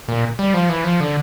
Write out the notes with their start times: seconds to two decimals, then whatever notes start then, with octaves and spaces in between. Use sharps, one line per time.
0.08 A#2
0.39 G3
0.54 F3
0.69 E3
0.84 F3
1.00 D3